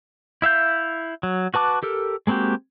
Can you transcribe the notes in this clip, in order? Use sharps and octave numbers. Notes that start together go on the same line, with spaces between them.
E4 E5 F5 G6
F#3
F#4 B4 A5 D6
G4 A4 A#4
G#3 A#3 C4 F#4 G4